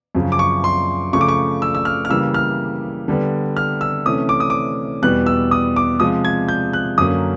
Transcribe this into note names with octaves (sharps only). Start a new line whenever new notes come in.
F#2 C#3 F3
D6
C#6
C6
C#3 F3 A3 C#6
D6
C#6
E6
E6
F6
F6
C#3 E3 G3 A#3 E6
F6
D3 G3 B3
F6
E6
C3 E3 A3 C#4 D#6
D6
D#6
D6
E2 B2 G3 B3 F#6
E6
D#6
D6
C3 F3 G#3 D#6
G#6
G6
F#6
F#2 D3 F#3 A#3 C#4 D#6